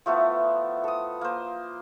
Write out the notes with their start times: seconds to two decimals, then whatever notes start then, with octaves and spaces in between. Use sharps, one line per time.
0.06 F3 A3 B3 E4
0.84 A4 D#6
1.21 A#3 C5